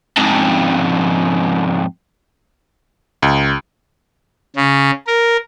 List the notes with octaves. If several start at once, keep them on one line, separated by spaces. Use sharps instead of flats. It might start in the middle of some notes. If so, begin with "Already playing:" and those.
F2 G#2
C#2
C#3
A#4